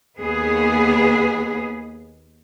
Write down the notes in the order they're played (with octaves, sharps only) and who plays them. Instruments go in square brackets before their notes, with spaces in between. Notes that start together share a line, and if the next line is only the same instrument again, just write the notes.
[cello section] D#2 B3 G#4